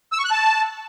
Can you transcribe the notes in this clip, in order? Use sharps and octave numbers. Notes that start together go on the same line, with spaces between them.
E6
C#6
F#6
A5